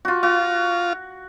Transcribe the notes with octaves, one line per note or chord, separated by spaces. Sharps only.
F4 F#4
F4 F#4